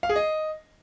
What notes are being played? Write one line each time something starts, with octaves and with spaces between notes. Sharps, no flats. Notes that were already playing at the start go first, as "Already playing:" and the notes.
F5
G#4
D#5